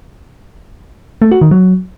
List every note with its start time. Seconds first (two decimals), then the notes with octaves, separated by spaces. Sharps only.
1.22 A3
1.31 F#4
1.41 D#3
1.51 F#3